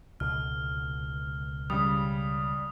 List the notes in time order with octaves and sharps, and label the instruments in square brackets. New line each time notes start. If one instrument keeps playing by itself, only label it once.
[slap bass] C#2 B2 D3 [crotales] F6
[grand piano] C#3 G3 [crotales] D#6